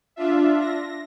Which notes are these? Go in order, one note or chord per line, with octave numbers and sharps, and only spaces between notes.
D4 F4 E5
A#6